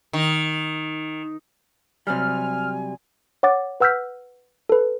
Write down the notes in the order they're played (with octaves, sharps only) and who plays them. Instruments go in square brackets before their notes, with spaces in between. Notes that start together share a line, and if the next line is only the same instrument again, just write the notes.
[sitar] D#3
[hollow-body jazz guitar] C3 F#3 G3 [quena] G#5 [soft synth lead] F6
[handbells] C#5 F#5 D6 A6
B4 F#5 E6 F6 G6 B6
A4 B4